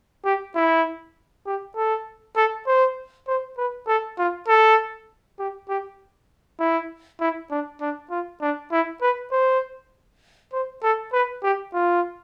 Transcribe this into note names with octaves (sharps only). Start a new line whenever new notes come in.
G4
E4
G4
A4
A4
C5
C5
B4
A4
F4
A4
G4
G4
E4
E4
D4
D4
F4
D4
E4
B4
C5
C5
A4
B4
G4
F4